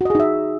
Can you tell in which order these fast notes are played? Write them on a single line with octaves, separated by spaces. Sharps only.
F#4 D#5 G#4 D#4 E5